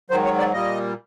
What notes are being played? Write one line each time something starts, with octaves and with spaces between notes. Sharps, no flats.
G#2 D#3 F#3 C5
C#5
D5
A#2 G3 A#3 D#5